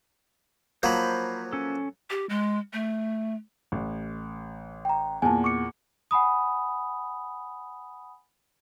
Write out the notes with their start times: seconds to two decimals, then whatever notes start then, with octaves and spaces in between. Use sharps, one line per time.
0.83 F3 F#3 A#3 C5 B5
1.52 C#4 A4
2.10 G4
2.29 G#3
2.73 A3
3.72 A1
4.85 G5 A#5
5.22 E2 A#2 G#5 A5
5.44 C#6 D6 C#7
6.11 F#5 G#5 B5 D#6